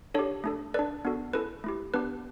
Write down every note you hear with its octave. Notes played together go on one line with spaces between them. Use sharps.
D4 G4 A4 C#5
A3 D4 A4
D4 A4 B4 D5
B3 D4 F#4 A4
C#4 E4 A4 B4
A3 E4 G4
B3 D4 G4 B4